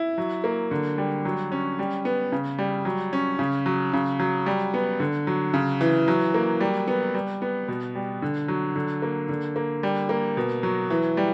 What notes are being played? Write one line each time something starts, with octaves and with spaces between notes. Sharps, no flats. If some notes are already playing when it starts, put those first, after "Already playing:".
Already playing: E4
F#3
A#3
D3
G3
F#3
C#4
G3
B3
C#3
G3
F#3
C#4
C#3
F#3
C#3
F#3
G3
B3
D3
F#3
C#3
E3
F#3
A#3
G3
B3
G3
B3
B2
G3
D3
F#3
D3
A#3
D3
A#3
G3
A#3
B2
F#3
E3
G3